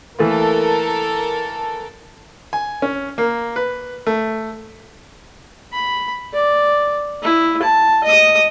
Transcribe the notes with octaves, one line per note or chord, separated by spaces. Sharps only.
E3 A3 A#3 A4 A#4
G#5
C#4
A#3
B4
A3
B5
D5
E4
A5
D#5 D#6